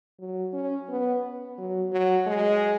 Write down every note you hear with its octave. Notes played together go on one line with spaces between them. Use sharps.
F#3
C#4
B3
F#3
F#3
G#3